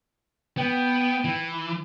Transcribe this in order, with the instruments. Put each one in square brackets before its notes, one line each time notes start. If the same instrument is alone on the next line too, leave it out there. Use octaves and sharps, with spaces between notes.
[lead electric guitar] B3 [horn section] G5
[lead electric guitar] E3